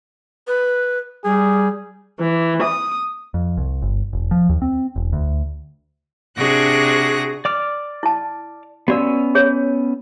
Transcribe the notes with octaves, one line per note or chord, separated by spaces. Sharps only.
B4
G3 G#4
E3
D#6
F2
C2
G1
E1
F3
D#2
C4
E1
D2
C3 D4 F#4 G#4 F#6 A#6
D5 D6 F6
E4 A5
B3 C#4 F#4 D5 E6
G#4 C#5